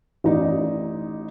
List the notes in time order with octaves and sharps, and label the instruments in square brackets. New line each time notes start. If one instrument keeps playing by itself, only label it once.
[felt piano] A1 D#4 D5